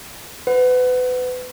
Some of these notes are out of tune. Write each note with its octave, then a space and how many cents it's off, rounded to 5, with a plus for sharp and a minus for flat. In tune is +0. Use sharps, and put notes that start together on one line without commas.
B4 +30 F#5 +0